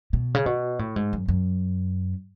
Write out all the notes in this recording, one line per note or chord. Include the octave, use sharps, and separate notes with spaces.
B2
C#3
B2
A2
G#2
F#2
F#2